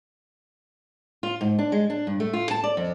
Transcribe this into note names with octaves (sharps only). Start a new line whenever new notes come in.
F4
G#2
D4
G#3
D4
G2
A3
F4
A5
D5
F2